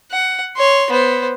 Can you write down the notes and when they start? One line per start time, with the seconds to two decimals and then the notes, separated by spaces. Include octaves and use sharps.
0.12 F#5
0.57 C#5 C6
0.91 B3 C5